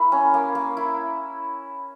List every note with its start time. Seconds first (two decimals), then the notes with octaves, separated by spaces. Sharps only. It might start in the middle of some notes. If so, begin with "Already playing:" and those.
Already playing: A#3 E4 B5
0.12 C#4
0.34 A#3
0.55 A#3
0.77 E4